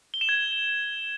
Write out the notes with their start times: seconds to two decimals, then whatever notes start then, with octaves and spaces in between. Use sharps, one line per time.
0.14 G7
0.21 E7
0.29 G#6